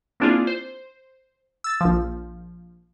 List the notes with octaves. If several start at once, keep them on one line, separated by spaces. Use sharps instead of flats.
A#3 C4 D4 E4 F4 G#4
C5
E6 A6
A#1 F3